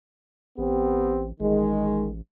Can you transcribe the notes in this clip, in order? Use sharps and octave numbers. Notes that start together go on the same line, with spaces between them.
A1 B3 C4 G4
A1 D#3 G#3